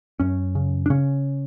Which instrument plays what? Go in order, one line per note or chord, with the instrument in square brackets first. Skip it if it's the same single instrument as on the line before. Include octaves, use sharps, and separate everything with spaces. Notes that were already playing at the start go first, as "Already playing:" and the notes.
[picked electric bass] F#2 C#4
C#3
D4
C#3 C#4